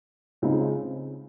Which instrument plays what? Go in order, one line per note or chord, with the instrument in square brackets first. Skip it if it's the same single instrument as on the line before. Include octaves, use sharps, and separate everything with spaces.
[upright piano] C#2 C#3 G#3 C4 D#4